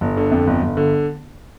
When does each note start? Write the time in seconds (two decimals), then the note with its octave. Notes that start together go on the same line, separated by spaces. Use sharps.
0.01 G1
0.17 D3
0.32 F2
0.47 G1
0.63 G1
0.77 D3